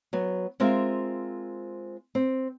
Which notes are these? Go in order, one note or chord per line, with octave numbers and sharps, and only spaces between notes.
F#3 B3
G#3 C4 F4 A#4 E5 F5
C4